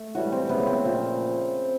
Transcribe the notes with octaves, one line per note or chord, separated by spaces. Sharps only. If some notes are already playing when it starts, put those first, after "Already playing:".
Already playing: A3
A2 E3 G3 F#4
C4
C#3 F#3 A3 B3
C4
A#2 F3 A3